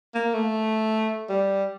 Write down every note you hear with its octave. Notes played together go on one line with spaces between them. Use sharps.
A#3
A3
G3